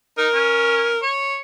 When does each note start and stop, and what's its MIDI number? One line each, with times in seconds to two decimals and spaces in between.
0.18 0.28 63
0.18 1.00 70
0.34 0.91 61
1.02 1.38 73